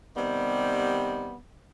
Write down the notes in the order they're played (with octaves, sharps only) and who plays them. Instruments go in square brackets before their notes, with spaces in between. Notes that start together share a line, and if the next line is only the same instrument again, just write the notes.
[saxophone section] C3 D#3 G3 B3